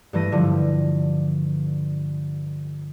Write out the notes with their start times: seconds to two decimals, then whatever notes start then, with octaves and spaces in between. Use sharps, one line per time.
0.13 G2 E3 A3 A#6 D#7
0.32 G2 D3 F3 G3